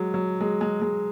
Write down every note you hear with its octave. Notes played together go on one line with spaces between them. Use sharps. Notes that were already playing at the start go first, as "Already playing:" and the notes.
Already playing: F#3 G#3
F#3
G#3
G#3
G#3